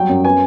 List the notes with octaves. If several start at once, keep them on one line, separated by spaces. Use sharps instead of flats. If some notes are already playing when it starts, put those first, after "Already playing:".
Already playing: F#3 G3 G5
F#2
B3 G#5